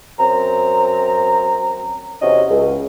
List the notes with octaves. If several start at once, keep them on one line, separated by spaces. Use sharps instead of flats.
F#2 C4 A#5
E2 C3 C#4 F#4 D#5
C#2